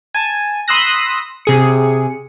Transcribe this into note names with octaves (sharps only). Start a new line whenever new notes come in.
G#5 A5
B5 C6 D#6 E6 F#6 A#6
C3 G#4 C#7